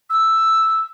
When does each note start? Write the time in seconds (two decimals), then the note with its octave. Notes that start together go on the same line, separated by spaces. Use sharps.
0.10 E6